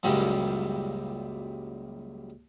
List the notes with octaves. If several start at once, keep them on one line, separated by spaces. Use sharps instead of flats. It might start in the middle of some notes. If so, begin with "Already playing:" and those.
C#2 F#2 A#2 G3